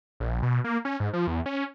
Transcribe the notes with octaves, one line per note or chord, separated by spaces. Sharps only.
A#1
B2
A#3
C#4
G#2
F3
E2
C#4